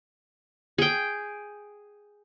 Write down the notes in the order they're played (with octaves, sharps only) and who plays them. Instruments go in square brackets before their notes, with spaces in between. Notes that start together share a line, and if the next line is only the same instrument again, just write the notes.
[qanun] G#4 G5